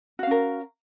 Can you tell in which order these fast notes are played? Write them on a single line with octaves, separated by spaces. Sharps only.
F#4 F5 C#4 A#4